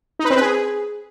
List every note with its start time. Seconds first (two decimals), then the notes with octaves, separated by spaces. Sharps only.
0.19 D#4
0.25 B4
0.30 C4
0.36 B4
0.41 G#4